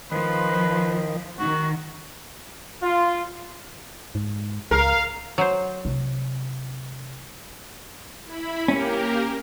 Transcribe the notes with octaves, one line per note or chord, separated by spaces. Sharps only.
D#3 F3 B4
D#3 F#4
F4
G#2
C#2 A#4 F5
F#3 C5
C3
E4 B5
A#3 C#4 G4 A#4